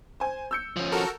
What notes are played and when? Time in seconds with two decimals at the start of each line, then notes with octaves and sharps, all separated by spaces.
0.20 C5 G#5
0.51 E6 G6 C#7
0.77 F3 C#4
0.92 F#4 A4 A#4